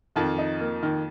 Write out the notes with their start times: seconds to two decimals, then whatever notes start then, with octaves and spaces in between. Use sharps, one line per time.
0.16 F2 D#3 F3
0.38 D#4
0.60 A#3
0.83 D#3